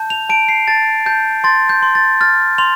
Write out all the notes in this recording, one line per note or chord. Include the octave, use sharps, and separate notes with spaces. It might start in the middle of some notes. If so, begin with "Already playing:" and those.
Already playing: A5 G6
F7
A5 D7
C7
A5 A6
A5 G6
C6 A6
G6
C6
A6
F6 A6
C6 F7